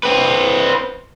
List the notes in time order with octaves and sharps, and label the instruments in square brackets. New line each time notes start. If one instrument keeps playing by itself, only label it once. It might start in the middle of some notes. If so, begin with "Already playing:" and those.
[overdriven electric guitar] C4 B4